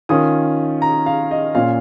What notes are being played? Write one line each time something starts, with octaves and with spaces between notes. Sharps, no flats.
D#3 C#4 F4 D#6
A#5
F5
D#5
A#2 A#3 C#4 F4 F5